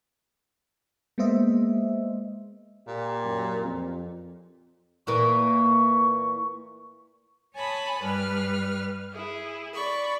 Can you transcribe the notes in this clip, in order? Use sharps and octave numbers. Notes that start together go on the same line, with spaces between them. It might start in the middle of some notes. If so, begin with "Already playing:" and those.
G#3 A#3 B3 C5 D#5 E5
A#2 G4
F#2
F2
A#2 E3 A#3 C#6
C#5 G#5 A5 B5 D#6
G2 G3 B4 F6
E4 G#4
D5 B5 C#6